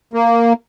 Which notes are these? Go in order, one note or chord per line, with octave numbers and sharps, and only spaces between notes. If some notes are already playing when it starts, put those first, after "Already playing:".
A#3